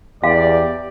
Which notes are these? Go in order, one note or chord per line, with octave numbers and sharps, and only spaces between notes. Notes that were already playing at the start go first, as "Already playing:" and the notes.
E2 G4 D5 F5